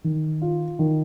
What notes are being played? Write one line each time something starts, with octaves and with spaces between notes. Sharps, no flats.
D#3
F4
D#3